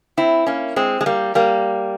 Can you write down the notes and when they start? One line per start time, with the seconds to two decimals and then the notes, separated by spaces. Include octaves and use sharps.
0.17 C4 E4
0.46 A#3 C#4
0.76 G#3 C4
1.01 G#3
1.06 G3 A#3
1.35 G3 A#3